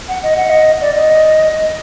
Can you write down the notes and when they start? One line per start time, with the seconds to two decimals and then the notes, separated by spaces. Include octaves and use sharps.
0.08 F#5
0.23 D#5
0.37 F#5
0.50 D#5
0.81 D5
0.97 D#5